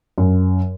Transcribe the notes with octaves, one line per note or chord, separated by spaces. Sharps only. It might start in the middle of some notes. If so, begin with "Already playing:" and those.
F#2